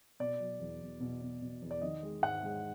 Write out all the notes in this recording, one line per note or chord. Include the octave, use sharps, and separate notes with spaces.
B2 D5
F#3
E2
E2
B2
B2
B2
E2
D5
D#3 D#5
G#3
G#2 F#5
G#3